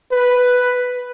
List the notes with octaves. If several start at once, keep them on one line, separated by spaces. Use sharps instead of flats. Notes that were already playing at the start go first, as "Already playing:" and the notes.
B4